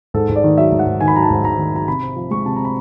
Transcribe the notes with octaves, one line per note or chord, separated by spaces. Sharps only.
G#2 A4
G#2
D5
D#3
F#3 E5
G#2
F#5
G#2
D#3 G#5
B5
F#3 A#5
A5
G#2
G#2 A#5
D#3
F#3 A#5
C3 B5
C4
F3
G#3 C#6
C3 A5
C4 A#5
B5